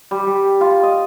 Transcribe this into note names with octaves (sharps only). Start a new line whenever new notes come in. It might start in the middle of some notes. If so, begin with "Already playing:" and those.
G3
G3
F4
D#5